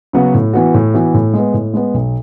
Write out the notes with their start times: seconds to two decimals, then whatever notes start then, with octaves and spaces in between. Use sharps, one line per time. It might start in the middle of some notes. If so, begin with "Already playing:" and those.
0.13 C#3 F#3 B3 F#4
0.34 A2
0.53 E3 B3 F#4
0.74 A2
0.94 E3 B3 F#4
1.14 A2
1.34 G#3 B3
1.54 A2
1.74 G#3 B3
1.94 B1